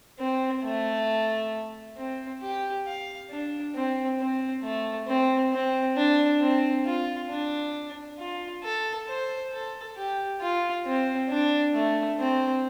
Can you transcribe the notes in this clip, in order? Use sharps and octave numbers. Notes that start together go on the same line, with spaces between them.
C4
A3
C4
G4
F5
D4
C4
C4
A3
C4
C4
D4
C4
F4
D4
F4
A4
C5
A4
G4
F4
C4
D4
A3
C4